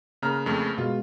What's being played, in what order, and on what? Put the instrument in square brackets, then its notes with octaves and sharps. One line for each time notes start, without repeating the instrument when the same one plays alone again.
[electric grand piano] C#3 A#5 F6 [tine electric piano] A#3 A#4
[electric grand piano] F2 C#3 A3
[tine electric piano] B2 G#3 B3 [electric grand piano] F4